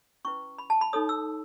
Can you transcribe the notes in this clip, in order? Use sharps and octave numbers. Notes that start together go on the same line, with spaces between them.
C#4 E4 B4 C#6
B5
A5
B5
D#4 A4 C#5 D#6
E6